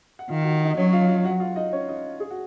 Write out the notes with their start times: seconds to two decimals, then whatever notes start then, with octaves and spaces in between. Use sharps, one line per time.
0.19 F#5
0.29 D#3 F4 F5
0.42 F#4 F#5
0.65 D#4 D#5
0.77 F#3 C#4 C#5
0.93 F4 F5
1.09 F4 F5
1.24 F#4 F#5
1.40 F4 F5
1.56 D#4 D#5
1.73 C#4 C#5
1.89 D#4 D#5
2.20 G#4
2.31 F#4